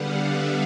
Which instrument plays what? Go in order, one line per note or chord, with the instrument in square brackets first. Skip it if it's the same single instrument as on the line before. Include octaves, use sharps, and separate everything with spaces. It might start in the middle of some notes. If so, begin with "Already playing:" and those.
Already playing: [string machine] D3 G3 B3 F5 F#5
E5